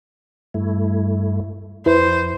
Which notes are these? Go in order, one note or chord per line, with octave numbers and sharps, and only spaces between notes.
G2 A3 E4
F2 E4 B4 C5